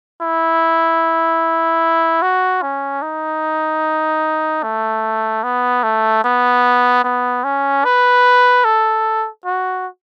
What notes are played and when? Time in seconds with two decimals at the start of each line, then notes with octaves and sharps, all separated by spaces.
0.21 E4
2.22 F#4
2.62 C#4
3.02 D#4
4.63 A3
5.43 B3
5.83 A3
6.24 B3
7.04 B3
7.44 C#4
7.84 B4
8.64 A4
9.45 F#4